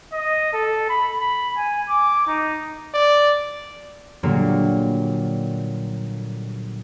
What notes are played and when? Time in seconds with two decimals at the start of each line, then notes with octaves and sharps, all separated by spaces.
0.13 D#5
0.53 A4
0.89 B5
1.20 B5
1.57 G#5
1.89 D6
2.27 D#4
2.94 D5
4.23 A#2 D3 F#3 G3 A#3